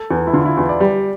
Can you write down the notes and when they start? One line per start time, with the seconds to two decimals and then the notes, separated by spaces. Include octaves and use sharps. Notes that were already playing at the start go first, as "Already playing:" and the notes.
Already playing: A4
0.11 E2
0.27 E4
0.33 D3 F4
0.46 E4
0.57 E2 F4
0.69 D5
0.80 G3